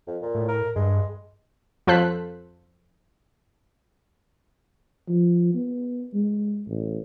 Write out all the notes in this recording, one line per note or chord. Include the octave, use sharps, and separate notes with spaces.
F2
A#2
A2
A#4
G2 G#3
F2 F4 A4 C5 F#6 B6
F3
B3
G#3
A1